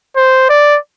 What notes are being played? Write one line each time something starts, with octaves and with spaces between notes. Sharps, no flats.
C5
D5